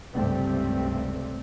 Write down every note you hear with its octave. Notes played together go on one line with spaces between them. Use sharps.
C#2 G2 C3 G3 A3 C4